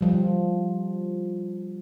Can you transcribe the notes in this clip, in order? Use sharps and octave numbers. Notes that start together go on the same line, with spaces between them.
F3 G3